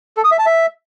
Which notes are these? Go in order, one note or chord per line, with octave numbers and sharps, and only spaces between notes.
A4
D#6
E5
A5
E5